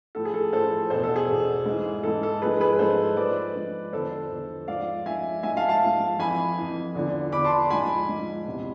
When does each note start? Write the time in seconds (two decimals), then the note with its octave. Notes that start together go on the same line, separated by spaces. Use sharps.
0.15 A2 F3 A4
0.25 G#4
0.34 A4
0.53 A2 F3 A4 C5
0.90 E2 B2 A4 C5
1.04 A4
1.16 G#4
1.28 E2 B2
1.66 G#2 E3
2.03 G#2 E3 A4
2.23 A4
2.42 G#2 F3 G#4 B4
2.61 G#4 B4
2.79 G#2 F3 A4 C5
3.17 G#2 F3 B4 D5
3.55 G#2 F3
3.93 E2 D3 F3 A4 C5
4.31 E2 D3 F3
4.68 G#2 F3 D5 F5
5.06 G#2 F3 E5 G#5
5.43 G#2 F3 E5 G#5
5.57 F5 A5
5.69 F5 A5
5.82 G#2 F3
6.19 F2 E3 G#5 B5
6.57 F2 E3
6.95 E2 D3 F3
7.32 E2 D3 F3 B5 D6
7.45 A5 C6
7.70 G#2 F3 G#5 B5
8.09 G#2 F3
8.46 E2 C3 E3